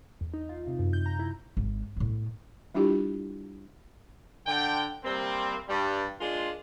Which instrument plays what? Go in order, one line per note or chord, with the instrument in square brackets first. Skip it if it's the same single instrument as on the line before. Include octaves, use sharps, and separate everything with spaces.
[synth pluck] E2
D#4
F4
C3
F#2
G6
A#5
E4
[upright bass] G#1
A2 B3
[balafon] G3 D4 E4 F4 G4
[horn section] D3 G5
C3 G3 A#3 C4
G2 G3
G#3 A#3 D4 F4